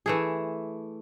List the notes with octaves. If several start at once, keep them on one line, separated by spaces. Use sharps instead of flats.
E3 A3 G#4